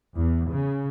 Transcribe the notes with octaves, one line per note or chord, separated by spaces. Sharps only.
E2
C#3